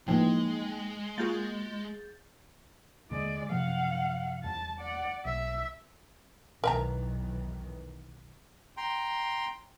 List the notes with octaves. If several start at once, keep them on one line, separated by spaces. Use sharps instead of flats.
A2 E3 F3 G#3 A#3 D#4 G5
A#3 F4 F#4 G#4 G6 A6
D#2 D3 G#3 D5
F#2 C3 F3 F5 F#5
E2 G3 A5
D5 F#5
B1 E5
B1 E2 D#3 A#4 E5 A#5
G5 A#5 C6